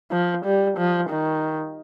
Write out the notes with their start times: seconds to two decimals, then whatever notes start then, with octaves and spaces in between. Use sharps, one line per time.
0.12 F3
0.45 G3
0.78 F3
1.10 D#3